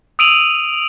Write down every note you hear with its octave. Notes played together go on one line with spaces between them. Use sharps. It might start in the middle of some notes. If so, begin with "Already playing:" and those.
D#6 E6 D7 D#7 F7 F#7